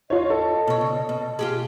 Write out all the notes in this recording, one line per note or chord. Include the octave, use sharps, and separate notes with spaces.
F4 C#5 D#5
A4
B2 C#5
C#3
B2
F4 G4 G#4